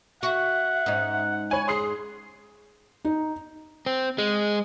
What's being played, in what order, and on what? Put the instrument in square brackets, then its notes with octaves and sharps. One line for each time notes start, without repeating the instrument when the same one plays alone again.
[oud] F#4 [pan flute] E5 [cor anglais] F#5
[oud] G#2 C#4 D#4
[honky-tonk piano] C#5 G#5 [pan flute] B5
[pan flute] G#4 [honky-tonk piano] C6 D#6 C7
[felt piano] D#4
[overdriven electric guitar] C4
G#3